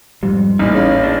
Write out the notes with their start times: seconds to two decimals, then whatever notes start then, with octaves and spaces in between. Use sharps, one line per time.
0.23 F2 G#2 G3
0.59 A1 A#2 D#4 E4
0.74 C#3
1.03 D4